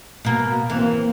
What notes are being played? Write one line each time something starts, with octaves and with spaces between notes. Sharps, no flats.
B2 A#3
E3 A#3 C4